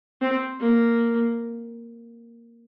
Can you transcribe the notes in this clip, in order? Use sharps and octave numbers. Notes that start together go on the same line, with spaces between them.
C4
A#3